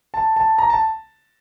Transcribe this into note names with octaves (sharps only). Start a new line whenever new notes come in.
A5
A5
A#5
A5